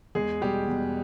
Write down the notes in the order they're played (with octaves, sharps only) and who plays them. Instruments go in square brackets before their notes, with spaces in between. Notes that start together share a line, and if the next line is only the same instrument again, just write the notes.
[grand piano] E2 G#3 G#4
B2 G3 G4
E2